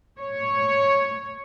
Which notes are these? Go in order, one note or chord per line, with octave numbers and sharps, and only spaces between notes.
C#5